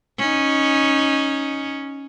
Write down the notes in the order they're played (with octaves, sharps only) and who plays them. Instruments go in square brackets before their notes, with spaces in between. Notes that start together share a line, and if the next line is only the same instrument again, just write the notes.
[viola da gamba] C#4 D#4